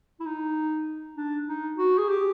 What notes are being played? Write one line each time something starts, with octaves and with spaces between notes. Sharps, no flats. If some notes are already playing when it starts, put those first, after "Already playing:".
E4
D#4
D4
D#4
F#4
G#4
G4